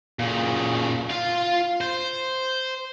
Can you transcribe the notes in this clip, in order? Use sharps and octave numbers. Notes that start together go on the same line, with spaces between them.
A#2 C#3
F4 F5
C5